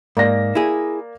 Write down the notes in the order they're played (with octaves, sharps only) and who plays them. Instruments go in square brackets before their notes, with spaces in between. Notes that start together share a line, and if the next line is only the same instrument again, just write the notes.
[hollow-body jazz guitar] G#2 [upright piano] A#3 D5 A#6
[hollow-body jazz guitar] E4 G#4